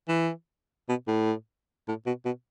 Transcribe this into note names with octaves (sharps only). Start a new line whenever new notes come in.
E3
B2
A2
A2
B2
B2